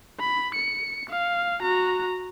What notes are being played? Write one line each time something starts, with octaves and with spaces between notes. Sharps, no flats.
B5
C#7
F5
F#4 A#5